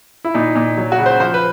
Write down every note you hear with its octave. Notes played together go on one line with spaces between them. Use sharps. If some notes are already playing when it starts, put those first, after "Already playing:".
E4
A#2 D#4
A#2
F#3
F#4
C#3
C5
F3 C5
B4